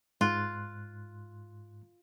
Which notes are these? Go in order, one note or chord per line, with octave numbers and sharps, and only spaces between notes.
G#2 F4 C6 F#6